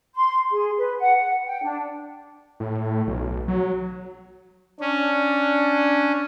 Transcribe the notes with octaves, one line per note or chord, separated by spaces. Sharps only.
C6
G#4
B4
F#5
F#5
G5
D4
A2
B1
F#3
C#4 D4